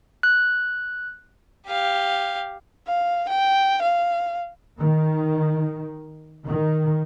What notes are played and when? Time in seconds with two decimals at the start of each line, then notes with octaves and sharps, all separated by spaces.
0.23 F#6
1.68 G4 F5
2.87 F5
3.29 G5
3.82 F5
4.79 D#3
6.46 D#3